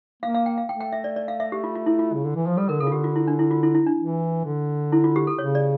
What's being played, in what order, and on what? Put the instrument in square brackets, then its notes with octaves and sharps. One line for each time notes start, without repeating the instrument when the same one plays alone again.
[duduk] A#3 [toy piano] F5
[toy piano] F5
G5
F5
[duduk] A3 [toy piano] G5
[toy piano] G5
E5
D5
D5
F5
E5
G4
F4
F4
E4
F4
[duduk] C#3
D3
E3
F3
[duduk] G3 [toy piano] A4
[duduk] D3 [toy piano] A#4
[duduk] C#3 [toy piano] A4
[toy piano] F4
[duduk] D3 [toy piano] G4
[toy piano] F4
E4
D4
E4
F4
E4
E4
D4
[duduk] E3
D3
[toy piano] E4
F4
G4
A4
[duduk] C#3 [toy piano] C#5
[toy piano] D5